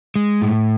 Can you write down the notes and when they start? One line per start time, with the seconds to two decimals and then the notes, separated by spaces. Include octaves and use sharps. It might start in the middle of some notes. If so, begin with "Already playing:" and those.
0.16 G#3
0.42 A2